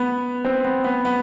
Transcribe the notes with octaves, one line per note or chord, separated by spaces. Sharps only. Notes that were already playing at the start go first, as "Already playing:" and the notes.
Already playing: B3
C4
B3
B3
B3